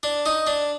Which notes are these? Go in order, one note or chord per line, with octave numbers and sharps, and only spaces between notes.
D4
D#4
D4